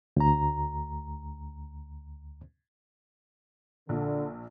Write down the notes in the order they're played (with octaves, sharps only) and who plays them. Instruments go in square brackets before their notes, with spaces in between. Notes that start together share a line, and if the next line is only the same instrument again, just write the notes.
[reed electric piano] D2 A#5
[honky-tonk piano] A#1 [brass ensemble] D3